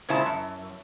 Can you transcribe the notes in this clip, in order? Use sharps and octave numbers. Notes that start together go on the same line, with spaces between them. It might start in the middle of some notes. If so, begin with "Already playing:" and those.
A#2 C#3 G#3 E4 C5 A5
F#2